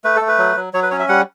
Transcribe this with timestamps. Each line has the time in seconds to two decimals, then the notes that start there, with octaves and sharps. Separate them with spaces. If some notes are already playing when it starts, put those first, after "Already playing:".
0.04 A3 B4
0.16 A3 A4
0.28 B4
0.38 F#3
0.57 F#3
0.73 F#3 C#5
0.83 B4
0.91 C#4 C#5
0.99 E5
1.09 G3 F#5